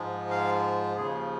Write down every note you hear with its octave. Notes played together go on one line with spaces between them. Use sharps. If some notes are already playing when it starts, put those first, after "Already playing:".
Already playing: G#2 F3 G#3
F5
D#2 C#3 F3 G#4